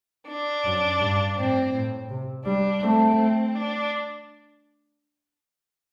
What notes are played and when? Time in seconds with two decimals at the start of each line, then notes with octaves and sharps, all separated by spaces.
0.28 D4
0.65 F#2
1.00 G2
1.37 A2 C4
1.73 A2
2.10 C3
2.46 G3 D4
2.82 A3 C4
3.56 D4